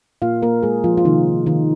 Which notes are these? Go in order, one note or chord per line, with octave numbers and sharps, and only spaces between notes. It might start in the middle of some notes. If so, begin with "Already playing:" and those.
A#2 A#3 F4 F5
A#3 A#4
G#3 G#4
F3 F4
F4
C3 D#3 F3 A#3 D#4
D#3 D#4